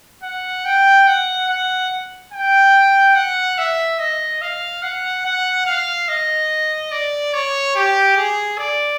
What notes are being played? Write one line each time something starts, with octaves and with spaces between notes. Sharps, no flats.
F#5
G5
F#5
F#5
G5
F#5
E5
D#5
F5
F#5
F#5
F5
D#5
D5
C#5
G4
G#4
D5